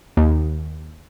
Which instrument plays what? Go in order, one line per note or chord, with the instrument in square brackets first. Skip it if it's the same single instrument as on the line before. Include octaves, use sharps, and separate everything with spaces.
[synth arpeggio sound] D#2